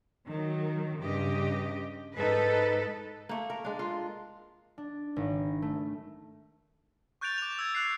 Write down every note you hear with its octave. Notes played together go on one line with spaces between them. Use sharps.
D#3 F#3
G2 C#3 G4 D#5
G#2 D#4 A4 B4
A3 A#3
A#4
G#3 D4
F4
D4
G#1
A3
C#6 F#6 G6 A6 D7 F7
D6 F7
E6 G#6
E6 F#6 C7